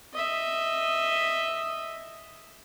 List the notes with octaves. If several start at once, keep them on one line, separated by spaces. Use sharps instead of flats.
D#5 E5